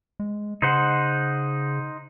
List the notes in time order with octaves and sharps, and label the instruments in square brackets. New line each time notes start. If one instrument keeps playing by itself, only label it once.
[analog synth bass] G#3
[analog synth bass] C#3 [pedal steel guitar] D#4 C5 F#5